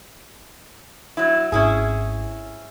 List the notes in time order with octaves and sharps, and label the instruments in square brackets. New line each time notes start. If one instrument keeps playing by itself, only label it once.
[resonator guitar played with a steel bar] F#3 E4
[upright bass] G#1 [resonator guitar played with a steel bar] C#4 E4 G#4